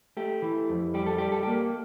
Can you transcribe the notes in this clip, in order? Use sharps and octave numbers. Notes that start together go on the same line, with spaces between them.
A3 G4
E3
F2
G3 G4
A4
G3 G4
A4
A#3 G4